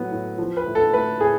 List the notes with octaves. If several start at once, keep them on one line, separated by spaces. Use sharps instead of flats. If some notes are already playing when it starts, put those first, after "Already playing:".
Already playing: A2 F#3 B3
A2
F3
B4
A2
A4
A3 B4
A2 G#4